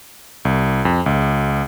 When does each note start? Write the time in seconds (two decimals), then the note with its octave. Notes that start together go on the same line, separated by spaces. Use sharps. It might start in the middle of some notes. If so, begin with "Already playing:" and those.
0.45 C2
0.85 F2
1.06 C#2